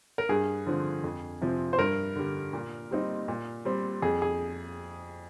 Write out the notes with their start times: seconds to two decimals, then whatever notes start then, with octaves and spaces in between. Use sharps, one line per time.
0.18 A#4
0.29 G2 G#4
0.66 D3 F3 C4
1.04 F2
1.41 C3 F3 C4
1.73 C5
1.79 G2 A#4
2.16 D3 G3
2.53 A#2
2.91 G3 C4 D#4
3.28 A#2
3.65 G3 C4
4.02 F2 G#4
4.22 G#4